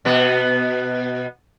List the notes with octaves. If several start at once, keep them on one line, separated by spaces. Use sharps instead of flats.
B2 B3